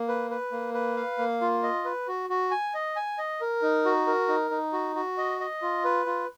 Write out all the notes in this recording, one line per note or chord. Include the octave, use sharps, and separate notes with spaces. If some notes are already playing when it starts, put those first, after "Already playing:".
Already playing: A#3
B4
B4
A#3
B4
F5
A#3
F4
D#5
B4
F#4
F#4
G#5
D#5
G#5
D#5
A#4
D#4
F#4
A#4
D#4
D#4
F#4
F#4
D#5
D#5
F4
B4
F4